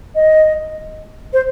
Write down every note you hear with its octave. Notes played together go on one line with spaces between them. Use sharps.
D#5
C5